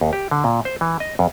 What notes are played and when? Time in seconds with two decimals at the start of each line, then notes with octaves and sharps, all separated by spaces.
0.01 D#2
0.13 G4
0.31 D3
0.44 A#2
0.65 C5
0.81 E3
1.00 D#5
1.19 F2